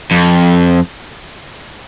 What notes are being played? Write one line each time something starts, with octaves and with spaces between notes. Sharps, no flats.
F2